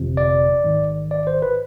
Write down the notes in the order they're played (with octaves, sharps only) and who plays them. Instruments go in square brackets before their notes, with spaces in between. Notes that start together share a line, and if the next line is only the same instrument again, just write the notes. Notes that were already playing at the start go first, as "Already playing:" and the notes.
Already playing: [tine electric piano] G1 F2 C3
D5
A1 G#2 D#3
D5
C5
B4